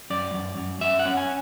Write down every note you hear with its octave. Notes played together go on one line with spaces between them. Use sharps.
F#2 D5
F#2
F#2
F#2 E5
F#5
C#4
G#5